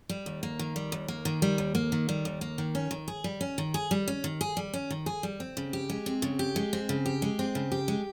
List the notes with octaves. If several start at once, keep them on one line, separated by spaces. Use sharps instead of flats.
G3
D#2
A#3
D#3
G3
D#2
A#3
D#3
G3
D#2
A#3
D#3
G3
D#2
A#3
D#3
C#4
D#3
G#4
G3
C#4
D#3
G#4
G3
C#4
D#3
G#4
G3
C#4
D#3
G#4
G3
C4
C#3
G4
G#3
C4
C#3
G4
G#3
C4
C#3
G4
G#3
C4
C#3
G4
G#3